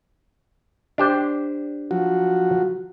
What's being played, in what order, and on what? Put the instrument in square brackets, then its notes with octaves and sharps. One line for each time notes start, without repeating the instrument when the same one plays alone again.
[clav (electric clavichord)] D4 G4 C5
[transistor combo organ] F3 F#3 F#4